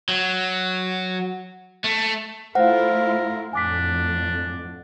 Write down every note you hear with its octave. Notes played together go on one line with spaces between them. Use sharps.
F#3
A3
A3 E4 F4 A#4 C5 F5 F#5
F2 A2 D4 G#5 D6 B6